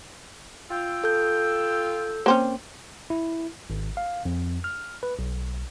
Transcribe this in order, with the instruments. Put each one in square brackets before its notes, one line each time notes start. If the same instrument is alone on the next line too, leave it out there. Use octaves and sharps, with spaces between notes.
[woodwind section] F4 G5 E6
[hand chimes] A4 G6
[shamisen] A#3 C4 C#4
[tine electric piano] E4
G#1
F5
F2
F6
B4
B1